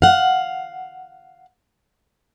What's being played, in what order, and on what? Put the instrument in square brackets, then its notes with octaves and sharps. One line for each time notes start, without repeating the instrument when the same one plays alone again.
[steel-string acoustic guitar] F5 F#5